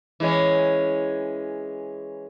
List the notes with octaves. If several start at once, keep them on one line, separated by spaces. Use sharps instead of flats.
E3 G#3 C#4